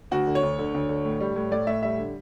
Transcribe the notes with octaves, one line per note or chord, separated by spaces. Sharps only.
D2 F#4
D3
C#5
D2
D3
D2
D3
A2
G3
A2
A2 D5
A2 E5
G3 E5
D3